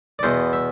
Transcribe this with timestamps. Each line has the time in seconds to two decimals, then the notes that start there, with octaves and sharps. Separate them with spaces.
0.19 D5
0.23 E2 B2 C5
0.53 E5